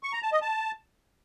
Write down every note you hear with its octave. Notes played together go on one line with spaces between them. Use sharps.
C#6
A#5
A5
D#5
A5